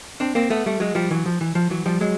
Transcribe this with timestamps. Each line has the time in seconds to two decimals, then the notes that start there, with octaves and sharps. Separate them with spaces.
0.20 C4 D4
0.35 A#3 C4
0.50 A3 B3
0.66 G3 A3
0.80 F#3 G#3
0.95 F3 G3
1.11 E3 F#3
1.26 F3
1.41 E3
1.55 F3
1.70 E3 F#3
1.86 F3 G3
2.01 F#3 G#3